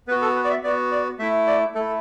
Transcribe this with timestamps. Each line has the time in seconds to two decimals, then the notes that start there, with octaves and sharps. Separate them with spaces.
0.08 B3 B4
0.11 F#4
0.22 A4
0.36 B4
0.45 D5
0.50 E5
0.63 B3 F#4 D5
0.91 D5
1.19 A3 E4 E5
1.47 D5
1.75 A3 E4 A4